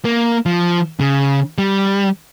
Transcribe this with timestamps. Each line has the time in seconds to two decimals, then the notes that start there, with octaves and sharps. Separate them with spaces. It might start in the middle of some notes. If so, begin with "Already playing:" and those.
0.05 A#3
0.46 F3
1.00 C#3
1.58 G3